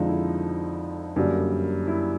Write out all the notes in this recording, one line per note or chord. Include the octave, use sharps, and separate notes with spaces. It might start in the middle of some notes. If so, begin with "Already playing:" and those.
Already playing: F2 D3 F3 G#3 D#4
E4
F#2 D3 G3 A#3
E4